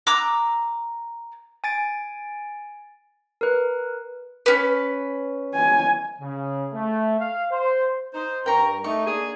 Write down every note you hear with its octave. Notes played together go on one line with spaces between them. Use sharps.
A#5 D6 E6 F#6
G#5 A6 D7
A#4 B4
C#4 B4
G#5
C#3
A3
F5
C5
D#4 C5
G2 A#4 G5 A#5 C#6
A3 D#4 C#6
A#3 D4 G#4